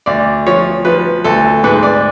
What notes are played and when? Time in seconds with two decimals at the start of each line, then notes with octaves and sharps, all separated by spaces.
0.06 D2 D5
0.47 F3 C#5
0.85 F3 B4
1.24 D2 A4
1.64 G#2 B4
1.83 D5